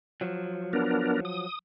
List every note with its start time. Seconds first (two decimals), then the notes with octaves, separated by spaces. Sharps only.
0.21 F3 F#3
0.73 B3 D4 A#4
1.25 D#6